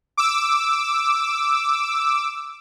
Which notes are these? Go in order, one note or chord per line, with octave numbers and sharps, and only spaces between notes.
D6 E6